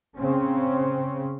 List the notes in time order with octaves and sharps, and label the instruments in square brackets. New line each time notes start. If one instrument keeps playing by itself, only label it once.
[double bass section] C#3 C4 C#4